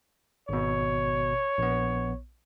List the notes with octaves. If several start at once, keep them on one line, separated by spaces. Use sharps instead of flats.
G#1 B2 C#5
A#1 B3